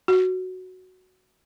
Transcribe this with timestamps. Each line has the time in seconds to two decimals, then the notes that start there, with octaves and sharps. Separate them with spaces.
0.08 F#4